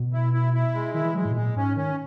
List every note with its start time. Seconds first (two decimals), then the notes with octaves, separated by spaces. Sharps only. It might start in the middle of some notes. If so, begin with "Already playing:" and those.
Already playing: B2
0.13 E4
0.33 E4
0.54 E4
0.74 G#3
0.94 D#3 E4
1.05 E3
1.15 F#3 G#3
1.25 G#2
1.30 B2
1.35 A#2 G#3
1.56 G#2 C#4
1.76 D#3 C#4